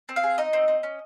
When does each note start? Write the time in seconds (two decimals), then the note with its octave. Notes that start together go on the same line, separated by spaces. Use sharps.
0.09 C4
0.16 F5
0.23 G#4
0.38 D#4 D#5
0.53 C4
0.68 C4
0.83 C#4